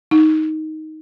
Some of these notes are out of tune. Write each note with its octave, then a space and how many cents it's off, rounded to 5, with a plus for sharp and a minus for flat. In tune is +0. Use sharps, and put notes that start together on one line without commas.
D#4 +10